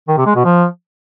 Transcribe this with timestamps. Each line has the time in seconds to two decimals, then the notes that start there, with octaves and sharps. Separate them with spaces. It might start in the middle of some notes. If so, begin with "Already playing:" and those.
0.08 D#3
0.17 C3
0.26 G#3
0.35 B2
0.45 F3